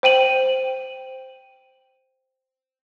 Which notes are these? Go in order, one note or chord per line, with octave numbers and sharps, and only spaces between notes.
C5 G5 D#7 F#7